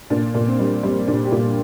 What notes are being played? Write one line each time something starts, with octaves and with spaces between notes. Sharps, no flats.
A#2 D4
A#2
C4
G3
G3 C4
A#2 D4
G4
A#2 F4